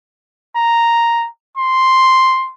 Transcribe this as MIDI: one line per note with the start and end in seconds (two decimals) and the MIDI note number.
0.56 1.28 82
1.57 2.53 84